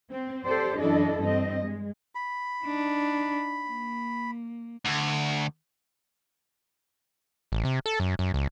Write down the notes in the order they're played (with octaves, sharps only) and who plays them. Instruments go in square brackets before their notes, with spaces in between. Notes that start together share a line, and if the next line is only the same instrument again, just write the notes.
[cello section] C4
G4 A4 C5 D5
F#2 E3 D4 E4 A4 D#5
G2 C4 D#5
G#3
[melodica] B5
[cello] D4 D#4
A#3
[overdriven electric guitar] D2
[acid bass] A1
C3
A4
F#2
F#2
C#2